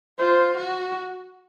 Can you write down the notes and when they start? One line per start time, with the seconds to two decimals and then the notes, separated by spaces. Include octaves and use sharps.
0.19 F4 C5
0.57 F#4